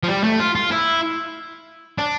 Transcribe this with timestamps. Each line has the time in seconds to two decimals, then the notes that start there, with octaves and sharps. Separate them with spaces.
0.03 F3
0.08 G3
0.24 A3
0.39 F4
0.55 F4
0.71 E4
1.98 D4